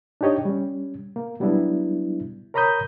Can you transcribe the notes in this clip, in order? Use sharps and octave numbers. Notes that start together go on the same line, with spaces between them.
D4 D#4 G4 C#5 D#5
G3 C#4
A#3
F#3 G3 B3 D4 E4
A#4 C#5 A#5 B5 D#6 G6